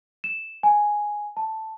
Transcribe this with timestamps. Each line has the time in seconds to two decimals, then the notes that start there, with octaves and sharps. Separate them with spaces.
0.24 E7
0.63 G#5
1.37 A5